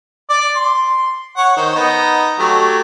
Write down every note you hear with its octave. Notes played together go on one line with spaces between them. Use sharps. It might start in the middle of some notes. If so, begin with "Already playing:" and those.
D5 D6
C6
C#5 F#5 C#6
D#3 C5
B3 D#4
F#3 A3 G4